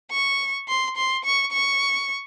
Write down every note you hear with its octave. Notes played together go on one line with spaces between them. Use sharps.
C#6
C6
C6
C#6
C#6